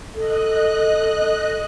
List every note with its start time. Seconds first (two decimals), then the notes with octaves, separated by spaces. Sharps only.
0.15 A4 D#5 F#6